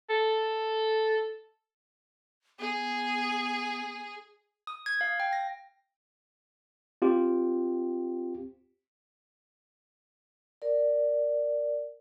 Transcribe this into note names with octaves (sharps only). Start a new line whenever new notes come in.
A4
B3 G#4
D#6
G#6
F5
G5
A#6
C4 F4 G4
A#4 D5